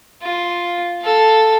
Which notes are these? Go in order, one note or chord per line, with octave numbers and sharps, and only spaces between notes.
F4
A4 F5